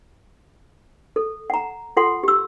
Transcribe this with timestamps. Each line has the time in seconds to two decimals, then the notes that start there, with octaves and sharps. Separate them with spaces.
1.16 A4
1.50 F#5 A#5
1.97 F4 A4 F#5 C6
2.23 G4 E6